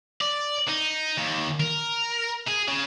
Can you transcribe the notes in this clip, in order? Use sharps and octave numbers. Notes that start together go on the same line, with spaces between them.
D5
D#4
D#2
A#4
G#4
C#3